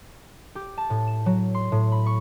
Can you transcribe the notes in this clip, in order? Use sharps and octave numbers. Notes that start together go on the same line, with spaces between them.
G4
A5
A2
E7
F#3
C6
A2
B5
C#6